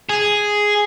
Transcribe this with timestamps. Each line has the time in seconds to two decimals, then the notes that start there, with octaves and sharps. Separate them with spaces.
0.09 G#4